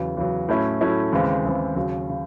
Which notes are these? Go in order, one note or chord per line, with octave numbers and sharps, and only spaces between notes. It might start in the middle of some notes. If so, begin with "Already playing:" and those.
Already playing: E2 C#3 F#3
E2 C#3 F#3
A2 F#3 A3 C#4 E4
A2 F#3 A3 C#4 E4
D#2 C#3 E3 G#3 C4
D#2 C#3 E3 G#3 C4
D#2 C#3 F#3
C#3